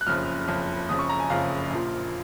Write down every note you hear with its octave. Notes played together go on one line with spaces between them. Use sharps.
F#6
F#1 F2 C#3 F3 F6
F#1 F2 C#3 F3
F#1 F2 C#3 F3 D#6
C#6
A#5
G#5
F#1 F2 C#3 F3 F5
A#1 A#2 F3